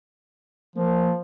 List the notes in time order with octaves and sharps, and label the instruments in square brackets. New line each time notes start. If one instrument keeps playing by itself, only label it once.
[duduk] F3 [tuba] A#3